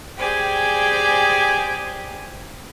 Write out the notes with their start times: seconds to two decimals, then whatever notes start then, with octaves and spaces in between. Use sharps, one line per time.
0.18 G4 G#4 C5 D5 G5 G#5